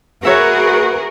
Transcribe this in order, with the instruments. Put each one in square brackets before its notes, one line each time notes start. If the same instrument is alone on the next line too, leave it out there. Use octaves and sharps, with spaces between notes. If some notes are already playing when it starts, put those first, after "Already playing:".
[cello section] F#4 G#4 A#4 [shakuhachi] B4 [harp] C#5 E5 A#6